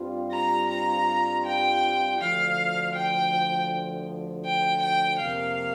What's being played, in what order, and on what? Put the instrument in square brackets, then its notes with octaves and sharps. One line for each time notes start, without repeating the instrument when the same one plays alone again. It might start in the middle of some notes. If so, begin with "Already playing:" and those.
Already playing: [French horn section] G2 G3 C4 F4
[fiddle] A#5
A#5
G5
[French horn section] D2 D3 F3 [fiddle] F5
[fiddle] G5
G5
G5
[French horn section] F2 C3 F3 A#3 [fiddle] F5